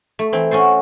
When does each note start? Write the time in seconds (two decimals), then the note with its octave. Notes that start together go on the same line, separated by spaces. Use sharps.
0.19 A3
0.33 E3 C4
0.51 C#4 F#4 A4 C5